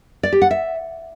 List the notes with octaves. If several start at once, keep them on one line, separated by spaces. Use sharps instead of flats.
D5
G4
F#5
E5